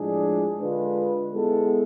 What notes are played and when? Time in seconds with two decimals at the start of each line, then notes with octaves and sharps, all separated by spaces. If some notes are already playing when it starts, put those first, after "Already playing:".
Already playing: A2 F3 G#3 D4 G#4
0.61 D3 G#3 D4 F4 B4
1.32 G#3 B3 E4 A4